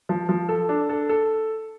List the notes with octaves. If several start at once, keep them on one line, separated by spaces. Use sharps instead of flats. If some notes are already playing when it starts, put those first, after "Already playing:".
F3
F3
A4
D4
A4
A4